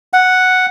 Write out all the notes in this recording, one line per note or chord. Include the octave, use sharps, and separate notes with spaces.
F#5